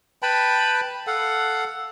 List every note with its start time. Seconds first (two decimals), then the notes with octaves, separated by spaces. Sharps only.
0.22 B4 G5 A5 B5
1.07 A4 F5 F#5